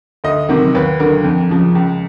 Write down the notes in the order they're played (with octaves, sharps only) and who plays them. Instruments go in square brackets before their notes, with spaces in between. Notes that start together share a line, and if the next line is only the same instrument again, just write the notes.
[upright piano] D2 D#5
C3 D#3 F#3
D#2 B4
D3 F#3 A#4
F2
C#3 F3
C#2